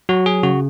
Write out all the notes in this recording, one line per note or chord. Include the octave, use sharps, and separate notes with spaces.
F#3 F#4
G#4
C#3 F#4